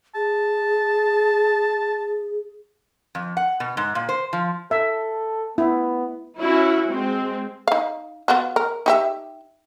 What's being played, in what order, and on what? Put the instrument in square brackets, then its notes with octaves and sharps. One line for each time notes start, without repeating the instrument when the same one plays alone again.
[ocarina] G#4 [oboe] A5
[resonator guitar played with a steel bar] F2
F#5
B2
G#2
A#2
C5
F3
[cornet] A4 [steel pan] E5
[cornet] B3 [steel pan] E4
[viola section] C#4 E4 F#4
G#3 C4
[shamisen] D#4 F5
B3 F4 F#4
A#4
D#4 G4 E5